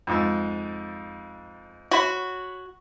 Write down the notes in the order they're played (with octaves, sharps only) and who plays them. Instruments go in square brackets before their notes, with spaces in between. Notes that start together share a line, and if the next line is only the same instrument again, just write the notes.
[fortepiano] F2 G#2 E6
[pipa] F#4 [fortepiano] C#5 B5